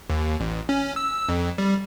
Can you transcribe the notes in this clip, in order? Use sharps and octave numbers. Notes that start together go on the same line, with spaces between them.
D#2
A1
C#4
E6
F2
G3